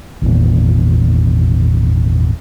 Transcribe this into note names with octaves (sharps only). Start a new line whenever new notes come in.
G#1 E2 A#2